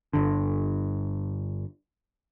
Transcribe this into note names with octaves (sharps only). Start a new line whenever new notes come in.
G1 D3